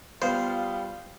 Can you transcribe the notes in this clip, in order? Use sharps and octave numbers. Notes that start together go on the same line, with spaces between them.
G3 B3 F4 C5 F5